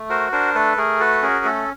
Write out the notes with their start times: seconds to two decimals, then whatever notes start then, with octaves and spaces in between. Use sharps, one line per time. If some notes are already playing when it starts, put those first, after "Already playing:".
Already playing: A3
0.09 F#4 A#4 C5
0.32 D4 A#4 C5
0.55 A3 A4 B4
0.77 A3 G#4 A#4
1.00 F#4 A4 B4
1.23 C#4 G#4 A#4
1.45 A3 A4